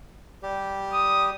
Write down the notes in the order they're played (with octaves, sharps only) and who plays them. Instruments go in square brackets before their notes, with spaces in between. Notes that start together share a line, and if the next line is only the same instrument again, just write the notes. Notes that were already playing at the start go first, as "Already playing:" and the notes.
[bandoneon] G3 G4
[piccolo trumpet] D#6